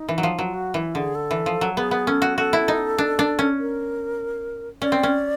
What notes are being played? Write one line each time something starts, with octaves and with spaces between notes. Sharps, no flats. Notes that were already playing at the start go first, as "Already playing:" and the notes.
Already playing: D#4
E3
F#3
F3
F#3
F4
F#4
E3 E4
D3 G#4
A4
E3
F3
F#3
B3 G#4
B3
C#4 A4
F#4
F#4 A4
E4
D#4
D4
D4
C#4
A#4
C#4 D5
C4
C#4